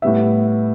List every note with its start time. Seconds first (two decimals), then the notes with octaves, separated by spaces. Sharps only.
0.02 A2 G3 B3 E5